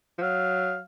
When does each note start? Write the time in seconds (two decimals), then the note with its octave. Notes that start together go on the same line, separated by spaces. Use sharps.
0.18 F3
0.22 F#3 F5